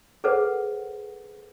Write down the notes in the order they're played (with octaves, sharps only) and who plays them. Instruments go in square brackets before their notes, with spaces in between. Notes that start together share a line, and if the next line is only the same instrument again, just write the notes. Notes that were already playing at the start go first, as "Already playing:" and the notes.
[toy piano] G#4 A4 B4 C5 F#5